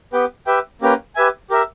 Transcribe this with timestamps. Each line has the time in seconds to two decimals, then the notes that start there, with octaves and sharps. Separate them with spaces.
0.13 B3 G4 B4 G5
0.46 G4 B4 E5 G5
0.81 A#3 C#4 G4 B4 G5
1.16 G4 B4 E5 G#5
1.50 G4 A#4 E5